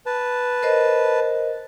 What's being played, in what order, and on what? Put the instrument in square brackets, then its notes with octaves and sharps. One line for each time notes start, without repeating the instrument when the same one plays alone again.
[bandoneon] B4 A5
[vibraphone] A#4 C5 D#5